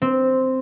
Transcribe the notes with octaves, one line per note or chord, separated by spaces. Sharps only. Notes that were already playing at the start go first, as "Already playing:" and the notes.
C4